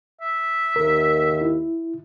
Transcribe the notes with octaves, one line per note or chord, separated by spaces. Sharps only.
E5
D#2 A#4
E4